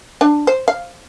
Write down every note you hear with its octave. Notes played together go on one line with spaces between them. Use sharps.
D4
C5
F5